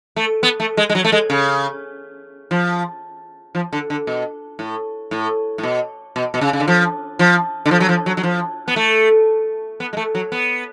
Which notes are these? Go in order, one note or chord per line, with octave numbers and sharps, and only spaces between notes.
A3
B3
A3
G#3
G#3
F#3
A3
G#3
C#3
F3
F3
D3
D3
B2
A2
A2
A2
B2
B2
B2
C#3
C#3
D3
F3
F3
D3
F3
F#3
F3
F#3
F#3
F3
B3
A3
B3
G#3
A3
F#3
B3